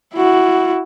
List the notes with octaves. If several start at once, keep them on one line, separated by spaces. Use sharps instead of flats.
E4 F#4